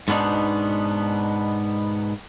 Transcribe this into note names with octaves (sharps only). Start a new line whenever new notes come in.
G#2 B2 B3 D4 D#4